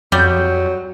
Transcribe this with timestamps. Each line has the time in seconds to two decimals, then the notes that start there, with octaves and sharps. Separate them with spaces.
0.12 F2 F#3 G3 G6